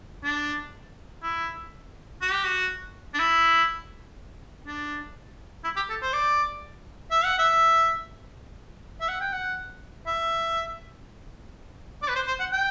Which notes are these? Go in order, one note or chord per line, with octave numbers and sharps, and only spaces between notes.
D4
E4
F#4
G4
F#4
D4
E4
D4
E4
G4
A4
C5
D5
E5
F#5
E5
E5
F#5
G5
F#5
E5
D5
B4
C5
C5
F#5
G5